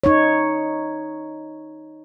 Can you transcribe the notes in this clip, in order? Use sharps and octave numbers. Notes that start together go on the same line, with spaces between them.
D#4 C#5